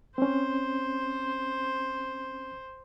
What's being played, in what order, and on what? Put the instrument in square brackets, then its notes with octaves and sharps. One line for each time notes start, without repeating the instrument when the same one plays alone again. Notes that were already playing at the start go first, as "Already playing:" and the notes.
[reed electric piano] C4 C#4 [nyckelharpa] C5